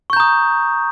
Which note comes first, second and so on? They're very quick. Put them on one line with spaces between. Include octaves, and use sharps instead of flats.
C#6 G6 A#5 D#6